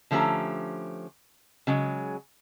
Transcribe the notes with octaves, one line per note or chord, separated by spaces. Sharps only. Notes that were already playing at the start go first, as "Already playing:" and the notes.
D3 F3 A3 C#4 G4 A#5
C#3 F#3 G#3